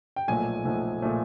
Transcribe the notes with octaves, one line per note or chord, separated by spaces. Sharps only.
G5
B1 A#2 F3 A3 G#5
B1 A#2 F3 A3
A#2 F3 A3